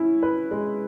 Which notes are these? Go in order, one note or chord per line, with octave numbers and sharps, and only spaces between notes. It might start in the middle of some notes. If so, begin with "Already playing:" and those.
Already playing: C#4 E4
B4
G#3